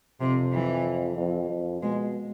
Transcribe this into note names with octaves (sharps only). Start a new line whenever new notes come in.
F2 C3
E3
F2
F2
B2 G#3